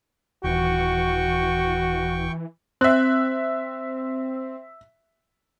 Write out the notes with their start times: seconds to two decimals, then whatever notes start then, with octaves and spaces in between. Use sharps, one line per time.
0.44 D#1 E3 F#4 G5 C#6
2.81 C4 E5 F#6